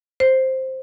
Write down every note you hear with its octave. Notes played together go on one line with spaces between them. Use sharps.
C5